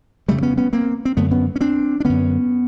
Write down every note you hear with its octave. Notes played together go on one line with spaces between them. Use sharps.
F2 C#3 G3 A3
B3 C#4
B3 C#4
A#3 C4
C4
F#2 D3 A3 B3
B3 C#4
C#4
C4 D4
D4
F#2 D3 B3 C#4